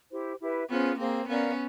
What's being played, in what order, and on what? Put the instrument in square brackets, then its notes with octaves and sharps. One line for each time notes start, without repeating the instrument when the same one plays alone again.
[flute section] E4 G4 C5
E4 G4 B4 E5
[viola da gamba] B3 C#4 [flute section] F4 G#4 C5
[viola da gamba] A#3 C4 [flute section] G#4 C5 F5
[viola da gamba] B3 C#4 [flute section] A#4 D5 F5 A#5